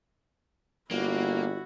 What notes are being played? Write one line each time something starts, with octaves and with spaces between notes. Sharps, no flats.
G1 A#3 E4 F#4